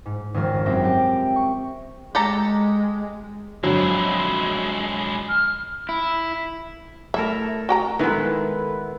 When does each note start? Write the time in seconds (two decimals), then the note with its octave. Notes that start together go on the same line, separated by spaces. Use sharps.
0.06 G#2
0.34 G#1 F2 C#3 A#4
0.66 F#2 C4 E5 G5 A#6
0.84 G4 G5
1.36 C#6
2.15 G#3 G4 A4 A#5
3.63 F2 D3 F#3 G#3 E4
5.29 F6
5.89 E4
7.14 A3 E4 A4 A#4 E5
7.69 F#4 G5 A#5
7.99 D#3 G#3 B3 E4 A4 B4